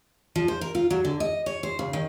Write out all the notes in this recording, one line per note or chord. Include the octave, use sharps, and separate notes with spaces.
F3
C5
A#4
F4
F#3
D3
D#5
C#5
C5
C#3
D#3